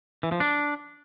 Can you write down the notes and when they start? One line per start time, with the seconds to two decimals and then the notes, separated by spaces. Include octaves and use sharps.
0.23 E3
0.32 F3
0.40 D4